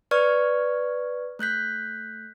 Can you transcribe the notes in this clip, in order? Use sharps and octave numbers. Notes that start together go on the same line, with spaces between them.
B4 D5 C#6 F6 G#6
A3 F#6 G6 B6